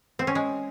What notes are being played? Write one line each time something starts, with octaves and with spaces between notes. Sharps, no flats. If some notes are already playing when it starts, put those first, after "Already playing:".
C4
C#4
G#3